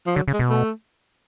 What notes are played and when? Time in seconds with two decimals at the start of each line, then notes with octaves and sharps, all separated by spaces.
0.07 F3
0.16 D3 F#3
0.28 C#3
0.34 G#3
0.39 B2
0.50 A3